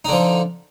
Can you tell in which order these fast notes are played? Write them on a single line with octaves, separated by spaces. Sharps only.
D#4 D3 F3